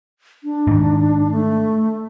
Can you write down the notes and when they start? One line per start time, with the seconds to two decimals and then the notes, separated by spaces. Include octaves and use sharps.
0.44 D4
0.67 G#2 D#3
1.31 A3